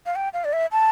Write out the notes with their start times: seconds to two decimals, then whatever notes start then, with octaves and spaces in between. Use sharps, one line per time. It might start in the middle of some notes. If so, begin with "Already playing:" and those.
0.06 F5
0.16 G5
0.34 F5
0.45 D5
0.53 E5
0.72 A5